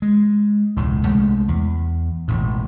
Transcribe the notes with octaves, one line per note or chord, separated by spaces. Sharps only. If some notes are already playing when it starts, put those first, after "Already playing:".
G#3
E1 C#2 A2
C2 G#3 A3
E2
E1 A1 A2